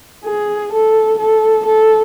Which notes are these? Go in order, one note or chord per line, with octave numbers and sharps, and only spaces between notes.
G#4
A4
A4
A4